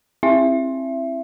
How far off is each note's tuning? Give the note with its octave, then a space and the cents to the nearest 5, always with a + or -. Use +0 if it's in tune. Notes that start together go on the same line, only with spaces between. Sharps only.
C4 +25 E4 +0 E5 +25